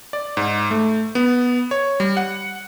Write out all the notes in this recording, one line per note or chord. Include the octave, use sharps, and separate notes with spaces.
D5
G#2
A3
B3
C#5
G3
F#5